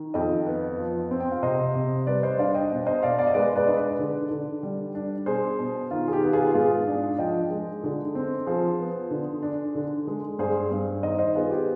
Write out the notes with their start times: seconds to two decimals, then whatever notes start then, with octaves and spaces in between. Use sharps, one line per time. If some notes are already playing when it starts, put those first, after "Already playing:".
Already playing: D#3
0.14 F2 D#5 G5
0.46 B3
0.78 F3
1.11 C4
1.20 G5
1.31 F5
1.43 C3 C5 D#5
1.75 C3
2.07 G3 B4 D5
2.23 C5 D#5
2.39 D4 D5 F5
2.54 D#5 G5
2.71 B2
2.86 C5 D#5
3.02 B2 D5 F5
3.18 D5 F5
3.27 D#5
3.34 G#3 B4 D5
3.56 B4 D5
3.67 D4 D#5
3.77 B4 D5
3.99 D3
4.31 D3
4.63 G3
4.95 D4
5.26 B2 G#4 C5
5.59 B2
5.91 D#3 F4
6.08 G#4
6.13 G4
6.23 B3
6.33 F4 G#4
6.54 G#2 F4 G#4
6.88 D4
7.18 F3 D#5 G5
7.51 G#3
7.84 D3
8.15 C4
8.46 F3 G#4 C5
8.79 B3
9.11 D3
9.42 D4
9.75 D3
10.07 G#3
10.39 G2 G#4 C5
10.71 G2
11.03 D#3 C5 D#5
11.19 C5 D#5
11.35 B3 F4 G#4
11.51 G4